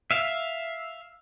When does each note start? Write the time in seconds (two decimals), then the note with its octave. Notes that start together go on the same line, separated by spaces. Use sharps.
0.11 E5 F5